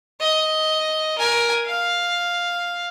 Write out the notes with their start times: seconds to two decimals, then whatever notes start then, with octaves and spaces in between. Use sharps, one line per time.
0.21 D#5
1.18 A#4 G#5
1.66 F5